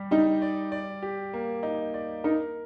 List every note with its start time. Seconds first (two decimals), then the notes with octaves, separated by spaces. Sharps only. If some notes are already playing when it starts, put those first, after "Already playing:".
Already playing: G3 G4
0.11 G3 D#4
0.42 D5
0.72 D5
1.03 G4
1.33 A#3
1.63 D#4
1.94 D5
2.24 D#4 A#4